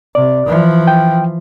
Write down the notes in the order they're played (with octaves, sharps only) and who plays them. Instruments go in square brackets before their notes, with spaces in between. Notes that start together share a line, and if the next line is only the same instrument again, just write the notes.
[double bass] C3 [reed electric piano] D5
[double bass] E3 F3
[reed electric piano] G5